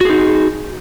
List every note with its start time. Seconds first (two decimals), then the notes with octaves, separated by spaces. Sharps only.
0.01 F#4
0.05 G#4
0.10 D#4